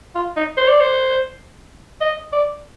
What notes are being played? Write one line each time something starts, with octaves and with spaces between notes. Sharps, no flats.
F4
D#4
C5
D5
C5
D#5
D5